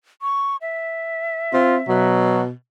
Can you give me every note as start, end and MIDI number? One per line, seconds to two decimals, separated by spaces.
0.22 0.57 85
0.61 2.07 76
1.53 1.82 60
1.53 1.76 65
1.89 2.51 47
1.89 2.42 54